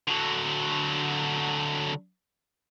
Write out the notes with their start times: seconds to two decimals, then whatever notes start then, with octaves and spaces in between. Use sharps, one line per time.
0.08 D3 F#3